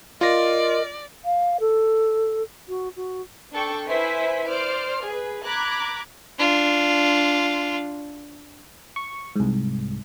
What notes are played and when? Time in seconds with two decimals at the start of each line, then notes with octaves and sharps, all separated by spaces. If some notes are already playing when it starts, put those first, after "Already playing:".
0.21 F4 A#4 D5 D#5 A#6
1.25 F5
1.60 A4
2.69 F#4
2.96 F#4
3.53 D4 A4 G5 C#6
3.88 E4 B4 C5 E5 G#5 B6
4.50 C5 D5 F6 D7
5.05 G#4 B4
5.45 A#5 B5 D6 F#6 G#6
6.38 D4 F4
8.96 C#6
9.36 C2 G#2